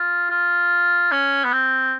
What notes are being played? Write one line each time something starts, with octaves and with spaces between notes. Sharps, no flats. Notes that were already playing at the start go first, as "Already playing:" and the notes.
Already playing: F4
F4
C#4
B3
C4